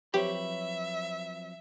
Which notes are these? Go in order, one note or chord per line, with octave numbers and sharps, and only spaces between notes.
F3 F#3 C4 G4 B4 C#5 E5